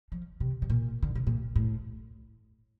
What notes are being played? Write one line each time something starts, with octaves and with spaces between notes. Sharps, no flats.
F3
C3
C3
A#2
D3
C3
A#2
A2